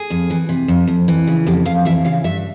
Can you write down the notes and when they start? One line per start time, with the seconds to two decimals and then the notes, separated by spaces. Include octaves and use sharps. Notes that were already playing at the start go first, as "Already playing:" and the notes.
Already playing: G#4
0.10 F2
0.30 E3
0.49 C3
0.68 F2
0.87 F2
1.08 E3
1.27 C#3
1.46 F2 G4
1.66 F2 F5
1.85 E3 E5
2.05 C#3 F5
2.24 G2 E5